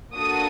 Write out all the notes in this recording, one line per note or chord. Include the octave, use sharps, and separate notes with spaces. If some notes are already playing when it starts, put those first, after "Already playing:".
A#3 D4 F#4 A4 D#6